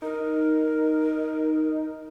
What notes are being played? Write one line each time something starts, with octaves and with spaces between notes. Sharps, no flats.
D#4 A#4